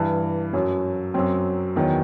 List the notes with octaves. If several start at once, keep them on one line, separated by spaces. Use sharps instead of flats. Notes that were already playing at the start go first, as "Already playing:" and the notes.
Already playing: G2 E3
F#2 F#3
F#2 F#3 C4
E2 D#3 F#3